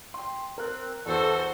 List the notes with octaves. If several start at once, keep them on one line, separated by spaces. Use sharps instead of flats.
G5 C6
C4 A#4 F#6
E2 E3 F#4 A4 C5